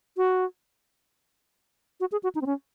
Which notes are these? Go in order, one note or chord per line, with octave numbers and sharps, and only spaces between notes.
F#4
F#4
G#4
F#4
D#4
C4
C#4